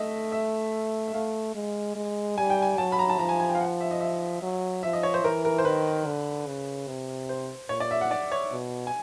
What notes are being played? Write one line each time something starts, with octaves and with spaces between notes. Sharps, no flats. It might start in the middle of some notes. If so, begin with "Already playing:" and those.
Already playing: A3 D#5 E5
E5
E5
A3 F5
G#3
G#3
G3 G#5
G5
G#5
F#3 A5
B5
A#5
A5
F3 A#5
G#5
G#5
G5
F5
F#5
E5
D#5
E5
F#3
F3 E5
D#5
C#5
C5
E3 A#4
A#4
C5
D#3 B4
D3
C#3
C3
C5
A#2 C#5
D5
E5
F#5
D5
C#5
B2
G#5